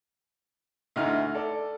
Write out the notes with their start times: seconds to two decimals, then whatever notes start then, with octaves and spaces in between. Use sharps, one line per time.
0.96 D2 D#4 E4 F6
1.34 A4 D5